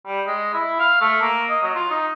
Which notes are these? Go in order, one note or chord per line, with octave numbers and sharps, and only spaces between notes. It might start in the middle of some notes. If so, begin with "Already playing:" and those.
G3
G#3
E4
F5
A3
A#3
D#5
F#3
F4
D#4